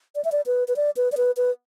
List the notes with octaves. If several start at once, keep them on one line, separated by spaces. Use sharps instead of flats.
D5
E5
D5
B4
B4
D5
B4
D5
B4
B4